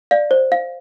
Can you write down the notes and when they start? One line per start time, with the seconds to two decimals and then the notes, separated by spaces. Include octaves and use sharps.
0.11 D5 F5
0.31 C5
0.52 F5